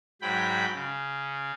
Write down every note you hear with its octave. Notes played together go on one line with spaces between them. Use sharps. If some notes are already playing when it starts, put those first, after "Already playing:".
G#2 F#3 G5 B5
C#3